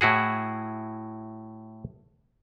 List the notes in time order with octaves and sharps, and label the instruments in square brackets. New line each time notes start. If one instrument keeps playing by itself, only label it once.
[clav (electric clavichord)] A2 E4 F#4 G#4